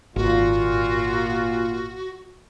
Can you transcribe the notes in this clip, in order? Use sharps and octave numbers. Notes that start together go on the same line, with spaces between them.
G#1 A#2 F4 F#4